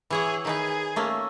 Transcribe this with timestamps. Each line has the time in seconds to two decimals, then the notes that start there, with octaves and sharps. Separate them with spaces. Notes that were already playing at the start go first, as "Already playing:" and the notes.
0.10 E3 G#4 C#5 F#5
0.45 D#3 D#4 G#4 B4
0.96 A3 A#3 C#4